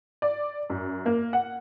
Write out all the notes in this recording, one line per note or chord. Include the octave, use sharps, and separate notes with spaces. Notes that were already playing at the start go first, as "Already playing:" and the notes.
D5
F#2
A#3
F#5